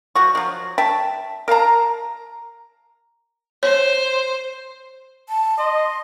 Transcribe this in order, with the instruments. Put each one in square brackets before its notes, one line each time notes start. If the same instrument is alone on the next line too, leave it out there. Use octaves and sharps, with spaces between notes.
[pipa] F3 F#4 C#6
F3 F#3
E5 G5 A5
A#4 F5 A5 A#5
[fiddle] C5 [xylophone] C#5
[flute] A5
[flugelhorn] D#5 [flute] C6